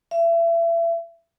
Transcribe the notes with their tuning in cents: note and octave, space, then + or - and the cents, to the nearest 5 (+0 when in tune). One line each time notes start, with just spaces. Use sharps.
E5 +30